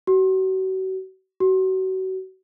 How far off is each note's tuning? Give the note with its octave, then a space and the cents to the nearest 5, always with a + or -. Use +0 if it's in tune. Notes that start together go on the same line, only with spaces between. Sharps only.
F#4 +35
F#4 +30